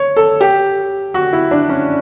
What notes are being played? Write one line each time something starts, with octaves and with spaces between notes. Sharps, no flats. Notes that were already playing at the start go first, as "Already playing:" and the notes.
Already playing: C#5
A4
G4
F#4
E4
D4
C#4